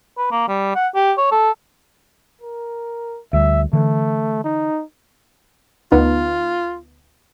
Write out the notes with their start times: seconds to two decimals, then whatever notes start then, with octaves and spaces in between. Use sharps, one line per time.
0.18 B4
0.31 A#3
0.48 G3
0.75 F#5
0.95 G4
1.17 C#5
1.31 A4
2.42 A#4
3.33 D2 G3 E5
3.73 D3 E3 A3
4.44 D#4
5.92 D2 B3 D#4 F4